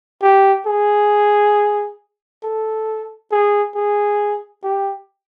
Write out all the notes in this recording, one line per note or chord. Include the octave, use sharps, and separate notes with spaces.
G4
G#4
A4
G#4
G#4
G4